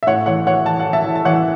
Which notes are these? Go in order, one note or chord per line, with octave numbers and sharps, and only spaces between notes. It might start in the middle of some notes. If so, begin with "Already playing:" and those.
E5
A2 C#5 F#5
E3 C#5 F#5
E3 C#5 F#5
E3 A5
F#5
E3
E5 A5
E3
A5
E3 C#5 F#5